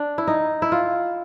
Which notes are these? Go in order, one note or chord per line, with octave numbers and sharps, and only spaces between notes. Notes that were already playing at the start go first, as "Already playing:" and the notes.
Already playing: D4
E4
D#4
E4
F4